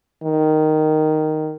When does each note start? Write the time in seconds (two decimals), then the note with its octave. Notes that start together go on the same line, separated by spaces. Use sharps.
0.23 D#3